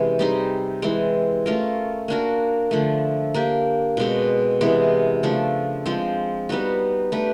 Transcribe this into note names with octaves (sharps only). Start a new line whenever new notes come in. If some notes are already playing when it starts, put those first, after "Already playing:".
Already playing: C3 E3 G#3 C#4
G3 C4 D#4 G#4
E3 G#3 C4
A3 C#4 F4 A#4
A#3 D4 F#4 A#4
D3 F3 A3
A#3 D4 G4
B2 G#3 C4
C3 E3 G#3 B3
C#3 F3 A3 D4
F3 G#3 C4
G3 B3 D#4 F#4
A3 D4 G4 B4